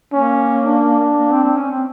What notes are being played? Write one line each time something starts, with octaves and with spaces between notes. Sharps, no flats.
A#3 C#4
D4
A#3
C4
C4
C#4
C4